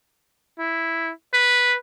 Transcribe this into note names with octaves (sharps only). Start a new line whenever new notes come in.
E4
B4